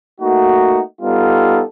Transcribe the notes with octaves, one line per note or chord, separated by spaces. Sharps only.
A3 A#3 D#4 F#4
G3 B3 D#4 F4 G4 A4